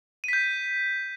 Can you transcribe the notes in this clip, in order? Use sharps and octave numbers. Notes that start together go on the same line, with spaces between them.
G6 B6 D#7